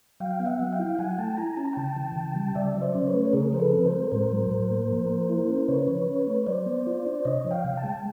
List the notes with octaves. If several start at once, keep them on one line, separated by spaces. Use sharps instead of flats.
F#3 F5 G5
B3
E5 F#5
F#3
F5 G5
E4
F#3 F#5 G#5
A3 G5 A5
E4 G#5 A#5
C#4 A5
A#5
C#3 G5 A5
E3
C#3
G3
C#3 D5 E5
F#3
C5 D5
C#4
B4 C#5
A3
B4
C#3 G#4 A#4
F3 C5
A4 B4
C4
A#4 C5
G#3
A2 A#4 C5
F#3
A2
A#3
F3
A#3
E4
C#4
C#3 B4 C#5
F3
C#4
A3
F#3 C5 D5
B3
F4
D4
C3 C#5 D#5
F3
F5 G5
C3
G5 A5
G#3